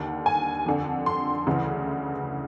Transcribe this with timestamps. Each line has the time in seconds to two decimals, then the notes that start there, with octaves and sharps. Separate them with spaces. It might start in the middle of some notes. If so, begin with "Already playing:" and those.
Already playing: D#2 D3
0.26 G#5
0.66 F2 D3
1.06 C6
1.46 D2 C#3 E3